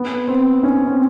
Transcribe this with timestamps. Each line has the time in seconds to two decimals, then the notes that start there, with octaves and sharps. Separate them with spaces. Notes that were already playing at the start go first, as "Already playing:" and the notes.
Already playing: B3
0.28 C4
0.63 C#4
0.87 C4